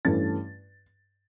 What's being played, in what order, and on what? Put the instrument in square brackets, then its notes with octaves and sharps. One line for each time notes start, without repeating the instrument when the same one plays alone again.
[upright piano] G2 E3 A3 C#4 A6